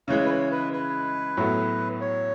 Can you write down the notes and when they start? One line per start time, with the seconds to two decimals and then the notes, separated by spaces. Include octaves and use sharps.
0.08 C#3 E3 G#3 C#5
0.25 B4
0.30 C#5
0.51 B4
0.73 B4
1.37 A2 F#3 B3 E4 A4
2.01 C#5